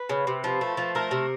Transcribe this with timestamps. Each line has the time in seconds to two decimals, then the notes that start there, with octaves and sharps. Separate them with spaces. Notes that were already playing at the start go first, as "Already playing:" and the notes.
Already playing: B4
0.09 C#3
0.27 C3
0.44 F3
0.61 A3
0.77 F3
0.95 A3 A#4
1.11 C3